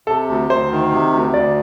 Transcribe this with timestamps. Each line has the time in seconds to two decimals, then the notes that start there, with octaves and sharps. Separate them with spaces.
0.07 C3 A4
0.28 D2
0.50 D2 C5
0.71 D#3
0.92 C3
1.13 D2
1.34 D2 D5